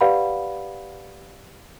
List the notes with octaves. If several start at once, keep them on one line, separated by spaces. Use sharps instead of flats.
G4 B4 D5 F5 F#5 B5